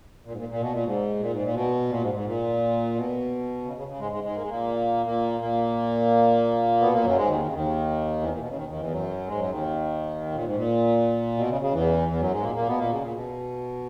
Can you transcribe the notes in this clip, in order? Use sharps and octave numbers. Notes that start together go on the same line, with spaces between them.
A#2
G#2
A#2
A#2
B2
A#2
G#2
A#2
G#2
A#2
B2
A#2
G#2
G#2
A#2
B2
C#3
C#3
C#3
G#2 G#3
G#2 G#3
G#2 G#3
A#3
G#3
A#2 A#3
A#2 A#3
A#2 A#3
B2 B3
A#2 A#3
F#2 F#3
G#2 G#3
D#2 D#3
D#3
C#3
D#2 D#3
E2 E3
A#2
B2
C#3
D#2 D#3
D#2 D#3
E2 E3
F#2 F#3
G#2 G#3
F#2 F#3
D#2 D#3
A#2
G#2
A#2
B2
C#3
C#3
E2 E3
E2 E3
F#2 F#3
G#2 G#3
A#2 A#3
A#2 A#3
B2 B3
A#2 A#3
C#3
A#2
B2